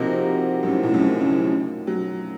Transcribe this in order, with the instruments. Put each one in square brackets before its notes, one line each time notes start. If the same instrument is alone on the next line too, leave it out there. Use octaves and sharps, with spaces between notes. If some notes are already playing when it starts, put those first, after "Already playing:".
Already playing: [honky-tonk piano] C3 [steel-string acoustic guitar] F3 A#3 D#4 F#4 A#4
[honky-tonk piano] F#2
A2
A2
F#2
C#3
F#3